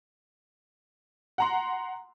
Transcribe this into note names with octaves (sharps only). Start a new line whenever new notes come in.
F#5 A#5 C6